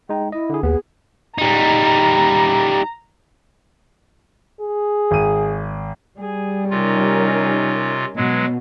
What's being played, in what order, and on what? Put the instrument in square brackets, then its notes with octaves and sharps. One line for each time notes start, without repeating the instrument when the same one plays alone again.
[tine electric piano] G#3 D#4 [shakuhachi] G5
[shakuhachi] E4 [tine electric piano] D#5
[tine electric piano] D3 G#4
[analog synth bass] D#2 [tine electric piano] B3 [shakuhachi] G#4
[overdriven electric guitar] G3 D#4 [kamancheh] A#5
[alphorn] G#4
[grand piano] G#1 D#7
[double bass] G3 [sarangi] G#4
[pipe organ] C3 F4 [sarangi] C#4 [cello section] D#4 A#4
[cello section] B2 [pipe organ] F#3 G#3